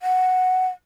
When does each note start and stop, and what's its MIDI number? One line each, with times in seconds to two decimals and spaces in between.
0.02 0.67 78